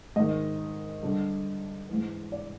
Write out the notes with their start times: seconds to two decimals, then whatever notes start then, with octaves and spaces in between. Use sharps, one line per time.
0.16 G#2 D#3 D#5
1.03 G2 D3
1.89 G#2 E3
2.32 D5